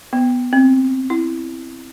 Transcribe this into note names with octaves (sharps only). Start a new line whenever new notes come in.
B3
C4
E4